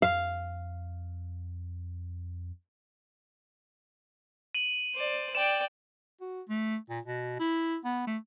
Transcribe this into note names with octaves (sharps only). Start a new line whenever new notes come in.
F2 F5
D#7 F#7
C5 D5
D5 G5 E7
F#4
A3
A#2
B2
E4
B3
A3